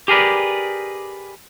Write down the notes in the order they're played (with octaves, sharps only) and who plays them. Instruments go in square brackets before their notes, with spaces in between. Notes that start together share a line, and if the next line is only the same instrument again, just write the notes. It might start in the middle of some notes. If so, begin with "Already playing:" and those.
[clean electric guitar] G4 G#4 A#4 B4 D5